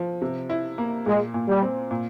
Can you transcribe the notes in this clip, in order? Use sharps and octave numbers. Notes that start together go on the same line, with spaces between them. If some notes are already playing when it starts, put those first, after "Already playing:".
Already playing: F3
C3
E4
A#3
A#2 G#3
A#2
G3
C4
A#2